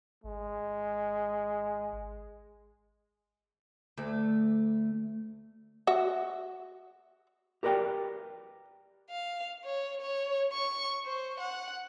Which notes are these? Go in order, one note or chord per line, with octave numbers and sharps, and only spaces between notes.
G#1 G#3
D2 A3
F#4 E5
G4 A#4 B4 D5 G5
F5
C#5
C#5
C#6
C5
F#5